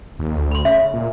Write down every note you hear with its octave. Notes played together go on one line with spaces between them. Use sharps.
D#2
D2
B5 C6
C#3 E5
A#2